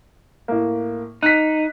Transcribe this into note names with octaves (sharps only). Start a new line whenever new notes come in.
A2 A#3
D#4 F#6 B6